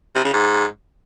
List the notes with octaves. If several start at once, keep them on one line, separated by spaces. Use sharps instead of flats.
C3
C#3
G#2